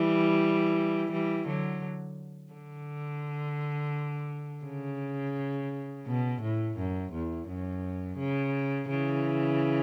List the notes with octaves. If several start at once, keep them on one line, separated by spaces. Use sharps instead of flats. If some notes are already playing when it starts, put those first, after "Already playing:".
Already playing: E3 G3
E3 G3
D3 F#3
D3
C#3
B2
A2
F#2
E2
F#2
C#3
C#3 E3